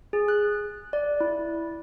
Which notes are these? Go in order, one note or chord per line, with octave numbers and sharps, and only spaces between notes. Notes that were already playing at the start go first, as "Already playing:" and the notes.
G#4
F#6
D5
E4